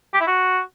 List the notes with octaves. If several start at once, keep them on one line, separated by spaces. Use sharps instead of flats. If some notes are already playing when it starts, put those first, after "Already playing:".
G4
E4
F#4